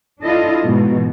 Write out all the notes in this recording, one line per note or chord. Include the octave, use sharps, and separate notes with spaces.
D4 E4 F4 A4 D#5
G#2 B2 E3